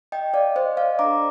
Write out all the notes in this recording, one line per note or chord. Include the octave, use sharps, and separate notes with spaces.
D#5 G5
D5 F5
C5 D#5
D5 F5
D4 A4 A#5 D6